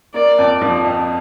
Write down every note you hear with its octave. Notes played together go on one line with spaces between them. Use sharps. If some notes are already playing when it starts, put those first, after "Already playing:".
A#3 D5
F2
F3
F2